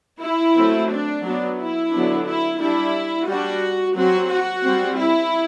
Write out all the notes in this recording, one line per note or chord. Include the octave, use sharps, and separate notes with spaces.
E4
F#3 A3 C4
D4
F#3 B3 D4
E4
D3 F#3 B3 D4
E4
G3 D4 E4
G3 F#4
D4
F#3 C4 F#4
F#4
G3 C4
E4